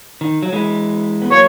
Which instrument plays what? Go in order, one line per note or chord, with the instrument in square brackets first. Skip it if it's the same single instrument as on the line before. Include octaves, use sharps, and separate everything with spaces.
[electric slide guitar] D#3
F#3
E3 G#3
B3
[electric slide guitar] F#3 A#3 [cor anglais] C#5